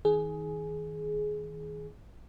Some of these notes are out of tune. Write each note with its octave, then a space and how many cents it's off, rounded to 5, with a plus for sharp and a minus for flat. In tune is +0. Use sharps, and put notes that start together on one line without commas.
D#3 +30 G#4 +15